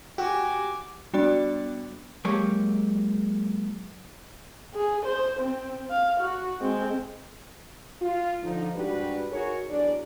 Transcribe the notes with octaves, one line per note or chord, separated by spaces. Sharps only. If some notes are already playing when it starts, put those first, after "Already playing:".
F#4 G4 G#5 D6
G3 B3 D4 F#4 D5
F#3 G#3 A#3 G4 C#5
G#4
C5
C4
F5
F#4
G#3 C4
F4
D3 F3 D#4
G#2 G3 D4 F#4 G4 B4
D#4 F#4 G#4 A#4 C#5
E2 F#3 D4 G#4 D5